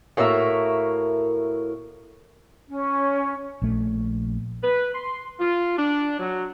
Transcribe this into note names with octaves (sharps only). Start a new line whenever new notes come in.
A2 A#3 F#4 A#4 E5
C#4
A#1 A3
B4
C6
F4
D4
F#3